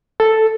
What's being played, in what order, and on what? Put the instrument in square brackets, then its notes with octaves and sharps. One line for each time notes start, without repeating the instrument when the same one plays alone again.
[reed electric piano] A4